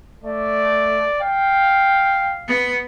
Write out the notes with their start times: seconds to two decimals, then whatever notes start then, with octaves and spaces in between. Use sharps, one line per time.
0.24 A3 D5
1.22 F5 G5
2.48 B3